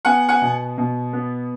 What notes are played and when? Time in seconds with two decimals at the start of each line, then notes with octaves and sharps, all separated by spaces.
0.05 B3 F#5 G#5
0.29 F#5 G#5
0.42 B2
0.78 B2
1.13 B3